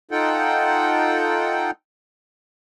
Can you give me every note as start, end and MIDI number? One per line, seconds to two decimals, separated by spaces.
0.11 1.71 63
0.11 1.71 65
0.11 1.71 69
0.11 1.71 78
0.11 1.71 79